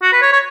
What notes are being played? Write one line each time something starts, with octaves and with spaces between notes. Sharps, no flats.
F#4
B4
C#5
C#5